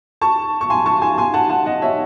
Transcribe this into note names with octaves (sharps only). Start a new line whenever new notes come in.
A5 C#6
C#6
G#5 C6
A5 C#6
G#5 C6
G#5 C6
F#5 A5
F#5 A5
D#5 F#5
C#5 E5